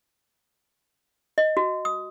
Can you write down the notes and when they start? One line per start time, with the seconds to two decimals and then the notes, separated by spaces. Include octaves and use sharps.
1.38 D#5
1.57 F#4
1.85 D#6